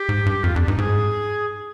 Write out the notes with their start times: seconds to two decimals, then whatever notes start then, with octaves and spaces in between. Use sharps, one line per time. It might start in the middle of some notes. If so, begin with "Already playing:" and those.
Already playing: G4
0.09 G#2
0.26 G2
0.43 F2 F4
0.55 F2 D4
0.67 G2 D#4
0.78 G#2 G#4